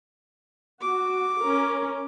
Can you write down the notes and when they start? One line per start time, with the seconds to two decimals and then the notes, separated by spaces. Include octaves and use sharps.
0.81 F#4 D6
1.40 C#4 A#4